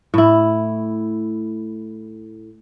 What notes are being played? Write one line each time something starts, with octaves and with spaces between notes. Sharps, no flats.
A2 E4